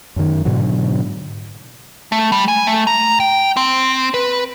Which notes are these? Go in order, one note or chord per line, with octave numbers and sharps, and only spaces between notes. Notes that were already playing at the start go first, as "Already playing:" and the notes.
F#2 D#3
G#2 B2 D3 F#3
A3
G3
G#5
A3
A#5
G5
C4
B4